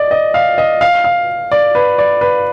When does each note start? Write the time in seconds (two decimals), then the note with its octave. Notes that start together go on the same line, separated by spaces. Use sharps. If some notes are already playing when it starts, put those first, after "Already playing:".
Already playing: D5 D#5
0.11 D#5
0.34 F5
0.58 D#5
0.81 F5
1.04 F5
1.52 D5
1.75 B4
1.98 D5
2.21 B4